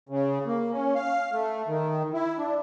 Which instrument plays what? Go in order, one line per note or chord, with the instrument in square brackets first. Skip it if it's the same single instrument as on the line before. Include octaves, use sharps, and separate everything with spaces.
[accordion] C#3
A#3
C#4
F5
A3
D#3
E4
D4